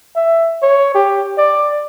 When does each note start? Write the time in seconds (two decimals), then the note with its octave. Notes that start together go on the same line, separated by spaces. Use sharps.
0.16 E5
0.63 C#5
0.94 G4
1.38 D5